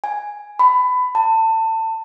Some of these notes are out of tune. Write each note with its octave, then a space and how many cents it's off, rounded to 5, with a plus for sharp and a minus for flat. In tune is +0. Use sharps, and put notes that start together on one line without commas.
G#5 +0
B5 +20
A5 +25